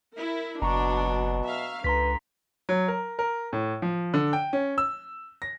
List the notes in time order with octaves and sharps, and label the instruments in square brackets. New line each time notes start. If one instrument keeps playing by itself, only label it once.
[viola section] E4 A#4
[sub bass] F#1 [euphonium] B2 [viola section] F#3 D4 [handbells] A#5 C#6
[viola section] E5 F5
[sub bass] C#2 [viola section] D3 [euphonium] B4 [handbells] A#5 C6 B6
[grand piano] F#3
A#4
A#4
A2
F3
D3
G5
C#4
E6
A#6